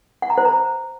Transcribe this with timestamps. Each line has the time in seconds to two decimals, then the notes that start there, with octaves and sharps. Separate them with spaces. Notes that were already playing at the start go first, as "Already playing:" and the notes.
0.22 F#5
0.30 A#5
0.38 C5
0.45 A#5